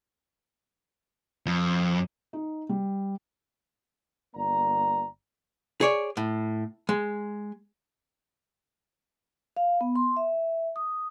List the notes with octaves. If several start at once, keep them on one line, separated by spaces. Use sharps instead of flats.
F2
D#4
G3
G1 A#3 D5 A#5
G#4 C#5 D5
A2
G#3
F5
B3
C6
E5
D#6